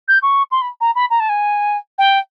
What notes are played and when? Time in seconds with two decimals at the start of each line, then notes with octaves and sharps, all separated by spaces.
0.08 G6
0.22 C#6
0.51 C6
0.61 B5
0.81 A#5
0.95 B5
1.10 A#5
1.20 A5
1.29 G#5
1.98 G5